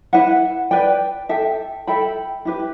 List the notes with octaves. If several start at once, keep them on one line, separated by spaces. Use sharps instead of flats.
E4 B4 F#5
B4 D5 G5
A4 E5 G5
A4 E5 G5 B5
E4 G4 B4